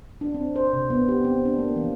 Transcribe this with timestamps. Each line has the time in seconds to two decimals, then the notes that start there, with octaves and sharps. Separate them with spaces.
0.21 D4
0.34 C4
0.56 C5
0.73 C3
0.90 B3
1.09 G4
1.25 C4
1.45 D4
1.59 A#3
1.76 E3